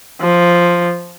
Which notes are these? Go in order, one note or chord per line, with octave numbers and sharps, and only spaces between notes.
F3